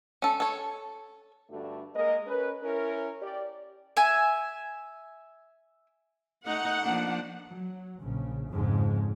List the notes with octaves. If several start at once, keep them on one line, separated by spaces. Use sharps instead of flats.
C#4 A4
A4 C#5
G2 D3 A3 D4 F#4
G#3 A#3 A#4 D#5
C#4 A#4 B4
C#4 E4 A#4
G4 D5
E5 G#5
A3 D#4 F#5
F3 A#3 D4
F#3
A#1 C#3
F2 G#2 C#3 G#3